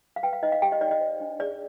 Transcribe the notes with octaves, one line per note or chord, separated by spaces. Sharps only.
F5
B4 G5
F5
D#4 D#5
F5
G4 G5
D#5
D#4 D5
D#5
C5
D4
G#4 D5